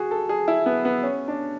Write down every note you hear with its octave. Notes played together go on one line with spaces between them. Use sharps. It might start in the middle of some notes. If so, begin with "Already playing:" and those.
Already playing: F#4 G#4
A4
G#4
E4
B3
B3
C#4
D4